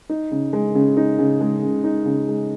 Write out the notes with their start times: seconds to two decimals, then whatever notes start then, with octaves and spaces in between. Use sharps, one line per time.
0.09 D#4
0.31 C#3
0.53 G#3
0.75 C#3
0.97 D#4
1.19 C#3
1.41 G#3
1.62 C#3
1.84 D#4
2.06 C#3
2.28 G#3